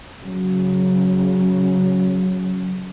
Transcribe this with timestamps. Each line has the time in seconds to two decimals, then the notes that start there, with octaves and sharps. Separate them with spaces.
0.21 C#3 F#3